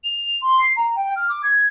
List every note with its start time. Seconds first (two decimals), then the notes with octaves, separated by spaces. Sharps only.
0.04 F7
0.42 C6
0.59 C7
0.77 A#5
0.96 G5
1.16 F6
1.29 D6
1.43 G#6